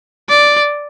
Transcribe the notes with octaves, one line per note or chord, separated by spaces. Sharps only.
D5